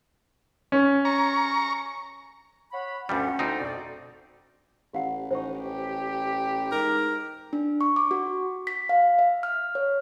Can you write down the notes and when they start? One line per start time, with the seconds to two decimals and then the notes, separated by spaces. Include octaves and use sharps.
0.72 C#4
1.05 A#5 C#6
2.71 C#5 F#5 B5
3.09 D2 G2 G3 C#4 F#5
3.39 D2 C4 D#4
3.59 F2 B2 D5
4.93 A1 G4 F5 F#5
5.31 A1 D#4 C5 G#5 C#6
5.60 G4
6.72 G#2 A#4
7.53 D4
7.81 C#6
7.96 D6
8.11 F#4
8.67 B6
8.89 F5
9.19 E5
9.43 F6
9.75 C#5